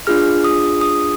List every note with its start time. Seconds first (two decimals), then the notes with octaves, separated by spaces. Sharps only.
0.07 D4 F4 G#4 F6
0.44 D#6
0.81 D#6